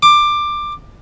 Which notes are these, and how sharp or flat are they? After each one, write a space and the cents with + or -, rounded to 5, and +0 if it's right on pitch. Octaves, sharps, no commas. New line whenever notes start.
D6 +15